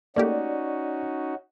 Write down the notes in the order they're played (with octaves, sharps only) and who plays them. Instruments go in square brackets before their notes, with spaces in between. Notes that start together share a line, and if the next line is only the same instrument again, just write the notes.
[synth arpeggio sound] A3 A#3 G4 [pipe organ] C#4 D#4 F#4 [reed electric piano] D5